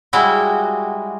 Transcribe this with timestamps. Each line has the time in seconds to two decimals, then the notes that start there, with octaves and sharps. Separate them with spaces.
0.13 G3 G#3 E4 F#4